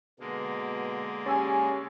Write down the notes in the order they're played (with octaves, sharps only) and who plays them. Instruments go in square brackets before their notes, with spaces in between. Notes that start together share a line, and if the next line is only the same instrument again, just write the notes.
[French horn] B2 [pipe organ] D3 G#3 A#3
[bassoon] C#4 [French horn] G4 [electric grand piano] G#5 E6 A6